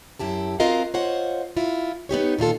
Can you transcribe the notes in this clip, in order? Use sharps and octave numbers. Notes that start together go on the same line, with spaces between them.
F#2 E4 G4 A5
C4 F4 F#4 A#4 D#5 F5
F4 C5 C#5 D#5 F#5
E4 F4
B3 D#4 G4 C#5
A#2 D#3 F4 A4